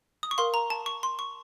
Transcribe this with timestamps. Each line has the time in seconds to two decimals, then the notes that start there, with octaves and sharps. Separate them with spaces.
0.23 D#6
0.31 C#6
0.38 A#4 F5 C6
0.54 A#5
0.70 A5
0.86 C#6
1.03 C6
1.19 C#6